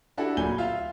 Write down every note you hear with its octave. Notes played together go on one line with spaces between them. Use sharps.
D4 E4 F#4 G4 A4
D1 A#2 G#5 B5 G6 G7
F4 E5 F5